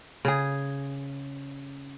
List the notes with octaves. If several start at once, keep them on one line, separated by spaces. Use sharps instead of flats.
C#3 G#4